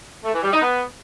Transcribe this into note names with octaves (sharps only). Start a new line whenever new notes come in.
A3
E3
G3
D#4
B3